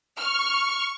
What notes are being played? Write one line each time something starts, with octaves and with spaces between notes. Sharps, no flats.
C#6 F6